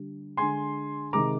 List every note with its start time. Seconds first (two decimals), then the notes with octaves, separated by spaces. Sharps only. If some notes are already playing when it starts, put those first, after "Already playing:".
Already playing: D3 G3
0.37 D3 G#3 G#5 C6
1.13 C3 D#3 G#3 A#5 D6